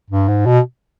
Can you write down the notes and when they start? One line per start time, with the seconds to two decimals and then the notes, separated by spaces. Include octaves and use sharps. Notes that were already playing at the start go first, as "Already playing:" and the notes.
0.10 G2
0.28 G#2
0.46 B2